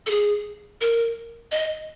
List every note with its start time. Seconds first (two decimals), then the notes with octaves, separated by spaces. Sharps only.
0.06 A4
0.11 G#4
0.81 A#4
1.52 D#5